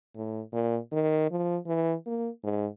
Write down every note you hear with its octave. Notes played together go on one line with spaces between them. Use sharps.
A2
A#2
D#3
F3
E3
A#3
G#2